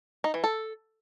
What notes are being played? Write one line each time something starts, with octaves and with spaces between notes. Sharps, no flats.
D#4
E3
A4